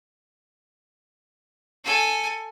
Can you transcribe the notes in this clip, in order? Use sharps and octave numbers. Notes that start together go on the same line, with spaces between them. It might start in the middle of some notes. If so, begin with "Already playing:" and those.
A4 G#5